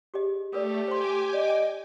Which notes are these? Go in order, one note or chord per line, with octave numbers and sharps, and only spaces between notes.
G4 G#4 D#5
A3 G4 A4 A#4 D5
C5 G5 G#5 C6 D6
D5 D#5